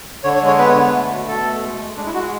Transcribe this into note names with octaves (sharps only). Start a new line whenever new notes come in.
D3 C#5
C#5
G#3
C#5
B3 B4
C#5
D3 B4
A3
B2
B2 A4
A3
G#3
G#3
G#3 D4
E4
G#3 F#4